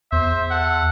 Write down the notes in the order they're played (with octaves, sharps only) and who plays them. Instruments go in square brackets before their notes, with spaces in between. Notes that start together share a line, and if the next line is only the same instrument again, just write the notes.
[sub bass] E2 [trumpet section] C5 E5
[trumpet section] A4 F#5